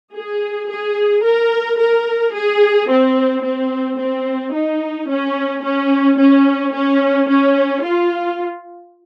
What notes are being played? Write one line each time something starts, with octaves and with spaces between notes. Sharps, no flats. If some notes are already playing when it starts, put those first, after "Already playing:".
G#4
G#4
A#4
A#4
G#4
C4
C4
C4
D#4
C#4
C#4
C#4
C#4
C#4
F4